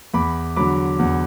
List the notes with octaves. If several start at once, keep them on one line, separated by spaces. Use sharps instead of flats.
E2 B5 D6
D3 F#3 B5 D6
E2